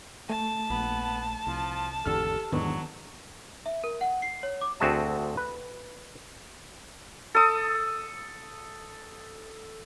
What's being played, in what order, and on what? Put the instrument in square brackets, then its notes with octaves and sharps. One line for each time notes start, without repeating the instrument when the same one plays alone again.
[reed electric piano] A3 [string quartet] A5
[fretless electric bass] A#1 [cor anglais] B3
[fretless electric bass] C2 [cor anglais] F3
[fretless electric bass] G#1 E2 D3 [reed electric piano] G4 F6 [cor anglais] A4
[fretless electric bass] E2 G#2 [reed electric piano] D#3 B3 D4 [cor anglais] F#3
[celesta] E5
A#4
F#5
C7
C#5
D6
[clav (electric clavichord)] D2 C4 F#4 G#4 E5 A5
B4
[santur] A4 D#6